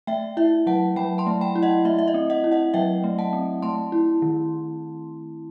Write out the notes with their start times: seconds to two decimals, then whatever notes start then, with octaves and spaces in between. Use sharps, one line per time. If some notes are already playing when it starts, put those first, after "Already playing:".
0.07 A3 E5 G5
0.37 E4 E5
0.67 F#3 F#5 A5
0.96 F#3 G5 B5
1.18 A5 C6
1.27 A3
1.41 G5 B5
1.55 E4
1.62 D#5 F#5
1.85 A3 E5
1.99 E5
2.08 D#5
2.14 C4
2.30 D#5 F#5
2.44 E4
2.51 D#5 F#5
2.74 F#3 E5 G5
3.04 A3
3.18 F#5 A5
3.33 C4
3.62 A3 A5 C6
3.92 E4
4.22 D#3